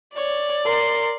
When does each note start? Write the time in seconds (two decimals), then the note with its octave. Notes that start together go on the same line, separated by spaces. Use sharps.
0.16 C#5 D5
0.65 A#4 C6